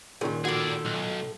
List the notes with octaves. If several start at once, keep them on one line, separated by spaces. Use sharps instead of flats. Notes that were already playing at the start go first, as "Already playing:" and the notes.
A#2 D#3 E3 F#3 C#4 G#4
A2 F#4 G#4 A4 D5
B1